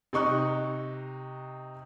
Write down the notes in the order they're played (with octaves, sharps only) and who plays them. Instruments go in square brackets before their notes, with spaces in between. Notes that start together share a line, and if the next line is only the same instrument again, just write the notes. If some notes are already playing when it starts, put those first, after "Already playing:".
[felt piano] C3 D#4 C#6 F#6